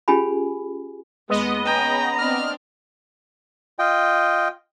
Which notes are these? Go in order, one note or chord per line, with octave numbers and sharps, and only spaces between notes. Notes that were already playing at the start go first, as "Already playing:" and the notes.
C#4 F4 G4 G#4 G#5 B5
D#2 G#3 B3 D#5
C#4 G#4 G5 A#5
C4 D4 D5 F6
F4 D#5 G5